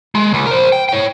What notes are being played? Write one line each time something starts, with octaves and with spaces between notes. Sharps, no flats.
G#3
C#2
A#4 C5
G5
C#5 G5